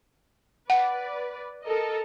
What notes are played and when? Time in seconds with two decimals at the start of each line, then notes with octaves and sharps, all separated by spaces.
0.70 B4 D5 F#5
1.63 A4 A#4 D#5